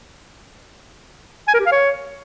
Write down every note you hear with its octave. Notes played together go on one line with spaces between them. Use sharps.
G#5
A#4
G4
F5
C#5